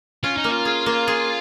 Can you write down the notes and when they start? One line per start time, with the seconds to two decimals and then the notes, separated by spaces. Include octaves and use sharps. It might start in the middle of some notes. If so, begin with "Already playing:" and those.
0.23 C#4 F4
0.37 D#4
0.44 A#3
0.50 F4
0.65 G#4
0.86 A#3
1.08 G#4